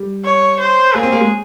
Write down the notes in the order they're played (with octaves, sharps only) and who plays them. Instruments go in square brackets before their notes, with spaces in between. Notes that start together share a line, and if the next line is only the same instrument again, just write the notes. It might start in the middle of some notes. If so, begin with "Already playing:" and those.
Already playing: [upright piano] G3
[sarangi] C#5
C5
[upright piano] A#3 [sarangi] G#4
[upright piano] C4
A#3
G#3